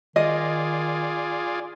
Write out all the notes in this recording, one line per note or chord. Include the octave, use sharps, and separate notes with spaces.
D#3 F4 G#4 D5 D#5